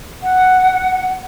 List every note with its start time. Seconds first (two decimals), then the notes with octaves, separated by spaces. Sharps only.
0.23 F#5